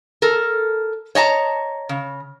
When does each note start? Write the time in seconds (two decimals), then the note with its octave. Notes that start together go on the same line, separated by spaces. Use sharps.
0.22 A4 A#4
1.15 C#5 D#5 A5 A#5
1.89 C#3